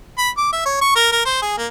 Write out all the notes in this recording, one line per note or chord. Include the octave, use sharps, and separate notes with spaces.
B5
D6
E5
C#5
C#6
A#4
A#4
C5
G#4
A#3